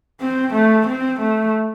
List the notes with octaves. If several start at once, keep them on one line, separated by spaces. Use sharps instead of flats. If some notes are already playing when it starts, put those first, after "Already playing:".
C4
A3
C4
A3